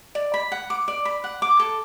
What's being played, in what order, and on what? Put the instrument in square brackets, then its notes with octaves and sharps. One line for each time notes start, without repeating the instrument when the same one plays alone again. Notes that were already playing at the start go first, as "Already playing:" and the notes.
[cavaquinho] D5
B5
F#5
D6
D5
B5
F#5
D6
A4